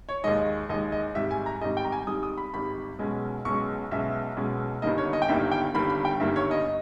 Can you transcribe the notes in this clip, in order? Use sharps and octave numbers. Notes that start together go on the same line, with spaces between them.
C#5
D#2 D#3 G#3 D#5
D#2 D#3 G#3 D#5
D#5
G#1 G#2 G3 E5
G#5
A#5
G#1 G#2 G3 D#5
G5
A#5
G#5
G#1 G#2 G3 D#6
D#6
B5
G#1 G#2 G3 B5
B1 B2 G#3 C#4
B1 B2 G#3 C#4 C#6
B1 B2 G#3 C#4 E5
B1 B2 G#3 C#4
G1 G2 D#3 G3 A#3 D#5
C#5
D#5
G5
G1 G2 D#3 G3 A#3 E5
G5
G1 G2 D#3 G3 A#3 B5
B5
G5
G1 G2 D#3 G3 A#3 E5
C#5
D#5